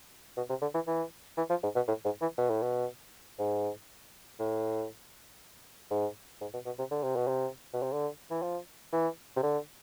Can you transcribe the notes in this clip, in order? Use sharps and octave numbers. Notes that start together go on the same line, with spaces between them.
B2
C3
D3
E3
E3
E3
F3
G#2
B2
A2
G#2
E3
B2
A2
B2
G#2
A2
G#2
G#2
B2
B2
C3
D3
C3
B2
C3
B2
C3
D3
E3
F3
E3
C3
D3